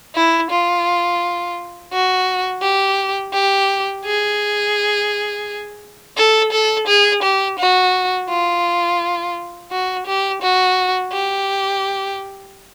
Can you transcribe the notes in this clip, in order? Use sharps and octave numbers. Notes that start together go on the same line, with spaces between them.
E4
F4
F#4
G4
G4
G#4
A4
A4
G#4
G4
F#4
F4
F#4
G4
F#4
G4